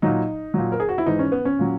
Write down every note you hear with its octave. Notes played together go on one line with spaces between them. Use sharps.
A#2 F#3 D#4
A#2 F#3
A#4
G#4
F#4
E4
G#2 E3 D#4
C#4
B3
C#4
A#2 F#3